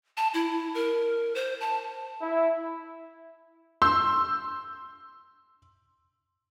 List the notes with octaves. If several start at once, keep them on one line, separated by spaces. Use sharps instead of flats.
A5
E4
A#4
C5
A5
E4
C6 E6 G6